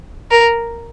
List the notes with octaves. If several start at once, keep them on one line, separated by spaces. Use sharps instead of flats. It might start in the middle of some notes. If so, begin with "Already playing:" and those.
A#4